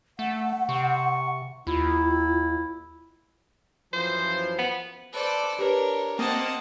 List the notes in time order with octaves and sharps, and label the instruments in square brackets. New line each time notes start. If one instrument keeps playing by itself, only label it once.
[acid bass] A3 [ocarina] F#5
[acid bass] C3 [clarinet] C#6
[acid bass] D#2 [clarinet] E4 [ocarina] F4
[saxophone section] F#2 E3 F3 [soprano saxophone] C5
[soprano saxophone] B3
[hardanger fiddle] A4 D5 [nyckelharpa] B4 C5
[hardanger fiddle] D4 C#5 [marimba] G4 B4 [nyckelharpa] A#4
[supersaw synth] A#3 C4 [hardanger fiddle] C5 F#5 [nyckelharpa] D#5 A5